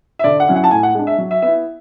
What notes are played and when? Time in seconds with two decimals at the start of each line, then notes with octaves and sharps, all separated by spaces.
0.19 E5
0.24 D3 D5
0.40 F#5
0.47 F#3 C#4 E4
0.56 F#5
0.64 A5
0.71 A2 G#5
0.83 F#5
0.95 G#3 D4
1.07 E5
1.18 F#3
1.31 E5
1.42 B3 E4 E5